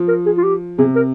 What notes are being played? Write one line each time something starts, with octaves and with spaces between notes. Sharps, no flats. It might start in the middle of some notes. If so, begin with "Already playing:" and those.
Already playing: F3
A#4
G#4
F4
G4
C3 G#4
A#4